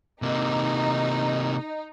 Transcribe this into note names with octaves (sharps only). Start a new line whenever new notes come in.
C3 A#3 D#4